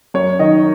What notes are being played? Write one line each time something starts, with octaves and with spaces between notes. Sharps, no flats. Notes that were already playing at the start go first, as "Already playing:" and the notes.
F#2 C#5
D#3 D#5